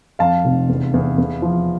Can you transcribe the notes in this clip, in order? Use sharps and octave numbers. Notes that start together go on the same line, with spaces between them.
F2 F5 A5
F1
E2
E2
E2
F3